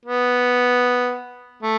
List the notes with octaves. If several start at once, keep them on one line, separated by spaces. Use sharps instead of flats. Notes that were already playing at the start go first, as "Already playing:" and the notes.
B3
A3